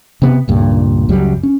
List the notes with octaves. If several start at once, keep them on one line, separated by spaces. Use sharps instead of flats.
C3 B3
C#2 G2 A#2
C#2 F#2 F#3 G3
C#4